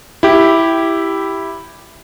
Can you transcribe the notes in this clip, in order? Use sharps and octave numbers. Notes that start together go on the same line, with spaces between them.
E4 G4